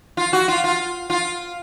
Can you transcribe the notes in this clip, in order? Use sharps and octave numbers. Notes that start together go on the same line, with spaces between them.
F4
F#4
F4
F4
F4